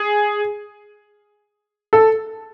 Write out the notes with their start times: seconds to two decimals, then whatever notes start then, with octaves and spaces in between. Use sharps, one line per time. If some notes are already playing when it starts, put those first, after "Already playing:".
Already playing: G#4
1.93 A4